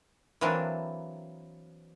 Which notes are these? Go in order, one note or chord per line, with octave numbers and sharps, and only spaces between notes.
E3 F#3 A#3 C4 D4